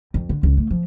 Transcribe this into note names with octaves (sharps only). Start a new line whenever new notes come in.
F2
D3
C#2
A3
F3